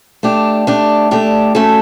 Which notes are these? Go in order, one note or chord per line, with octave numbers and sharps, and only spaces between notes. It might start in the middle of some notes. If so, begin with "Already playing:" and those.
A3 D4 G4
A3 D4 G4
A3 D4 G4
A3 C#4 F#4 A4